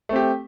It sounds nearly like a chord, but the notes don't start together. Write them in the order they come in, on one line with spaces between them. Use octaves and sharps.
A3 C4 G4